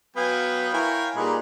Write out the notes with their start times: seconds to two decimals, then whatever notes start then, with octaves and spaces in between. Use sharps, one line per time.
0.16 F#3 B3 F5 G5 G#5
0.74 E4 A#4 C#5 G#5
1.16 A#2 G3 D#4 G#4 B4